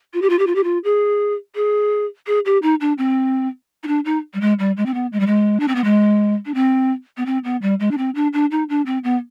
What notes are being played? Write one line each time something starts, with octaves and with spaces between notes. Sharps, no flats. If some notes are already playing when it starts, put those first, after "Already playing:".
F4
G4
F4
G4
F4
G4
F4
G#4
G#4
G#4
G4
D#4
D4
C4
D#4
D4
D#4
G3
G#3
G3
G#3
C4
B3
G#3
G3
G#3
D4
C4
B3
G#3
D4
C4
B3
C4
B3
G3
G#3
D4
C4
D4
D4
D#4
D4
C4
B3